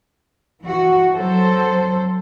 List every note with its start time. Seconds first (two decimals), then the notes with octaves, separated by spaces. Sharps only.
0.63 E3 F#4
1.16 F#3 C4 A4 C5